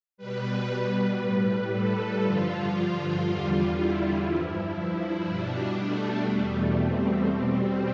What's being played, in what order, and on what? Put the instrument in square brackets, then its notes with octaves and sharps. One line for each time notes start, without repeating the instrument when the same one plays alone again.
[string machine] B2 G3 B4
A2 G3
A4
G2 D3 F3 F4
F4
E2 D3 G3
E4
G2 F3
B2 G3 D4
A3
E2 B2 G3 A3
C4
B2 G3 C4